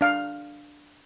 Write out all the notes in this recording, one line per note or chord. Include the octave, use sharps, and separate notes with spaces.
D4 F5